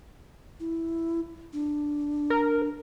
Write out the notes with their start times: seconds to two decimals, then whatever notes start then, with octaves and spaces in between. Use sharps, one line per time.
0.60 E4
1.53 D4
2.30 A#4